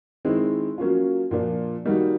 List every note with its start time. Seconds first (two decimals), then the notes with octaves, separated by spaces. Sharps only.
0.25 D#3 G#3 C4 E4
0.78 F#3 A#3 C#4 F4
1.31 A#2 F3 A#3 D4
1.85 D#3 G3 A#3 D#4 F#4